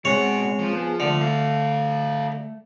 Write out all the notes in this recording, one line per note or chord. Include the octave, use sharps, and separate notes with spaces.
B2 G#3 C4 G#4 C#5 F#5
F3
B3 G#4
D3 A3
A4 F5